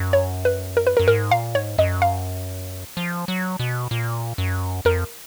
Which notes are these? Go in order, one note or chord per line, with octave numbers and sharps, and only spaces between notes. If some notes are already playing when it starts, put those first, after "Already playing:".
Already playing: F#2
C#5
B4
A#4
B4
A#4
F#2
G#2 A#4
A#2 F5
G#2 C#5
F#2 D#5
F5
F3
F#3
B2
A#2
F#2
F2 A#4